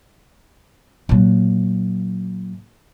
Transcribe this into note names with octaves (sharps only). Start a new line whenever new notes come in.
A#2 F#3